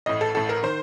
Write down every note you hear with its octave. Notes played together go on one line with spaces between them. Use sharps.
A1 A2 D#5
A4
A1 A2 A4
A#4
D#3 C5